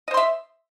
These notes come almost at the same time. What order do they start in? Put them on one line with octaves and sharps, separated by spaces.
D#5 C5 C6 E5